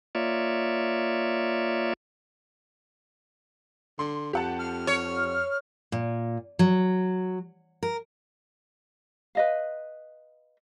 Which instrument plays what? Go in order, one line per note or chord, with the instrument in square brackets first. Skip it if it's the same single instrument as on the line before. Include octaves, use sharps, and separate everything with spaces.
[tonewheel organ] A#3 F4 C#5 D5 E5
[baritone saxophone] D3 [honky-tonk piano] C6
[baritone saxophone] F2 [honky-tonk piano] G4 F#5 A5
[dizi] F6
[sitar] C#5
[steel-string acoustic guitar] A#2
F#3
A#4
[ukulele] B4 D#5 F5